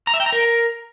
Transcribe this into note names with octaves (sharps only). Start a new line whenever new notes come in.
A#5
E5
G5
A#5
A#4